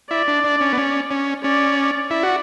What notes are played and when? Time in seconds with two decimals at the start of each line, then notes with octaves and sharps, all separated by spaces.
0.11 E4 D5
0.28 D4
0.44 D4
0.61 C#4
0.73 B3
0.77 C#4
1.11 C#4
1.43 C#4 D5
2.10 E4 D5
2.23 F#4